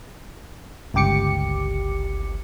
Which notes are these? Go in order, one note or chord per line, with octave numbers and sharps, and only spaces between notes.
G1 C#2 G4 D6 C#7